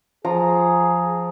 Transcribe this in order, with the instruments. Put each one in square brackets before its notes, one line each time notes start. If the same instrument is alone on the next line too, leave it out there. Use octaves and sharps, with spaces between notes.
[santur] F3 A#5 [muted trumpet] G#4